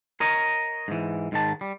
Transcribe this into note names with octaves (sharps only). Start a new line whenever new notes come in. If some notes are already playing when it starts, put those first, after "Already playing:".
A#4 C#5 D#5
G#2 E3
G#2 D#3 A5
G3